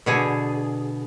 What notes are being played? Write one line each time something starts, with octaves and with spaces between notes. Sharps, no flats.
B2 D3 G#4